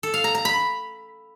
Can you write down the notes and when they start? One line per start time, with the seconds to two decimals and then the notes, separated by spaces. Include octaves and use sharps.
0.03 A4
0.14 F5
0.24 A#5
0.35 A#5
0.45 B5